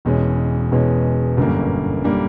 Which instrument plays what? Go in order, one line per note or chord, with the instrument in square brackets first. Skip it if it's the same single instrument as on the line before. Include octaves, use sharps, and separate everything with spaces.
[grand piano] E1 E2 B2 G#3 C#4
E1 E2 B2 G#3 C#4
G1 F#2 D3 G3 A#3
D3 G3 A#3